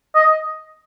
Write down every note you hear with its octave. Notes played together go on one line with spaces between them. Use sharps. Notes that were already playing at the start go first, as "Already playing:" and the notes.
D#5